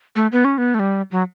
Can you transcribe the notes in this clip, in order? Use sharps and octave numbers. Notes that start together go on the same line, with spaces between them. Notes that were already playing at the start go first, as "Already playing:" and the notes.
A3
B3
C#4
B3
A3
G3
F#3